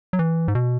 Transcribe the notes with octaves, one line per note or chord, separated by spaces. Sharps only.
F#3
E3
G#2
B2